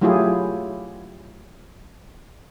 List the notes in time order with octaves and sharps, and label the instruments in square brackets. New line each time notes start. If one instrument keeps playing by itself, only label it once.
[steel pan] F#3 A3 E4 F4 G4 G#4